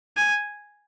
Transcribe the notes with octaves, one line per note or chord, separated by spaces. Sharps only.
G#5